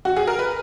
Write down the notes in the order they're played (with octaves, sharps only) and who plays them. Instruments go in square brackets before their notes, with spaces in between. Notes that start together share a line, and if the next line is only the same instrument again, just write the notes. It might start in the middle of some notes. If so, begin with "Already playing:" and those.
[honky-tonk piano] F#4
G#4
A#4
B4